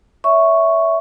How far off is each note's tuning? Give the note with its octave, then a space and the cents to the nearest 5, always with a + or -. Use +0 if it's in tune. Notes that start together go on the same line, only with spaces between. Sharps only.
C#5 +35 E5 +0 C#6 +0